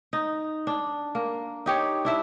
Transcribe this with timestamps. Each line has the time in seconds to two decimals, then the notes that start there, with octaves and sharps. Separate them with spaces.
0.13 D#4
0.67 D4
1.15 A#3
1.66 D#4 G4 C#5
2.05 D4 E4 E5